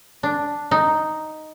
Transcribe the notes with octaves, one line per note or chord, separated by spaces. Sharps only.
D4
D#4